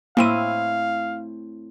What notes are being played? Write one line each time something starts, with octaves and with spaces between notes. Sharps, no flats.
A2 A#3 C4 E4 F5 G5 D#7